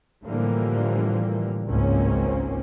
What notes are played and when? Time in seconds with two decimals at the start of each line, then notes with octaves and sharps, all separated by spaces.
0.25 A2 D3 E3 F3 G3 A#3
1.67 G#1 C#2 G#2 A#3 C4 C#4